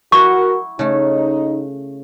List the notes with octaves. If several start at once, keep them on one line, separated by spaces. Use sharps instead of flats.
E4 F#4 A#4 E5 F#5 C#6
C#3 A3 D#4